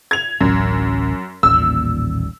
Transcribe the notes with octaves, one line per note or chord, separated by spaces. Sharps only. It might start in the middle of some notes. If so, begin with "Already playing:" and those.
G#6 F7
D1 A1 F#2
D#1 A1 A#2 E6